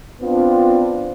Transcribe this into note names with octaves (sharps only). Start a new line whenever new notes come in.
B3 C4 D4 F4